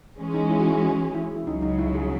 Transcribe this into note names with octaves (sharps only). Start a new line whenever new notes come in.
E3 G#3 C#4
D#4
E4
F#4
E4
F#4
E4
E4
C#2 C#3 F#3 D#4
D#4
E4
G#4